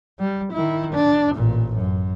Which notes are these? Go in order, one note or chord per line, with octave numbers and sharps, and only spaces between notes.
G3
D#3 E4
D4
A1 A#2
F#2